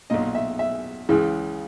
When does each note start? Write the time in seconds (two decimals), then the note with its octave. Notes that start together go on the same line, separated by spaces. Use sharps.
0.10 B1 A#2 D#5
0.35 E5
0.59 E5
1.09 C#2 C#3 E3